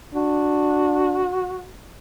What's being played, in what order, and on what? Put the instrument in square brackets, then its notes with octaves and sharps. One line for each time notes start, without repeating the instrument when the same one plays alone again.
[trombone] D4 [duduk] F#4